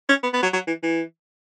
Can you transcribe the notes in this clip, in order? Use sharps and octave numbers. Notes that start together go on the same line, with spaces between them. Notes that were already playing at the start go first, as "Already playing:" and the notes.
C#4
B3
B3
F#3
F#3
E3
E3